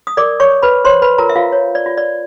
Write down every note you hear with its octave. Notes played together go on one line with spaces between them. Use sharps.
D#6
A#4 D5 D6
C#5 C#6
C#5
B4 B5
C5 C#5 C6
B4 B5
F4 A#4 A#5
E5
F4 F5
C#5
D5
F4
D5